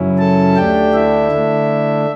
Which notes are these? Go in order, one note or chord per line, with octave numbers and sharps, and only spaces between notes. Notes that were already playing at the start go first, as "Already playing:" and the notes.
Already playing: F#2 C#3 F#3 C#4 E4
A4 A5
D2 D3 A3 D4 G4 G5
E4 E5
D3 A3 D4